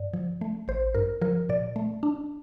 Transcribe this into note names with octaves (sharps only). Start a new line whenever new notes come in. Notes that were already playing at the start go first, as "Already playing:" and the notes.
Already playing: G2 D5
F3
A3
A1 C5
G2 A#4
F3 A#4
A#2 D5
A3
D4